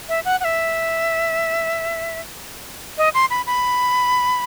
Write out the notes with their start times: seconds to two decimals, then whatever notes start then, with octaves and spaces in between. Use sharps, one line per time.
0.09 E5
0.25 F#5
0.40 F#5
0.44 E5
2.98 D#5
3.14 C6
3.30 B5
3.46 B5